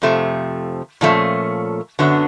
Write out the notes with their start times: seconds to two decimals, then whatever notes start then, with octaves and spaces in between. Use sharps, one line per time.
0.02 F2 C3 F3 A3
1.01 A#2 F3 A3 C#4
1.99 F#2 D3 F#3 B3 D4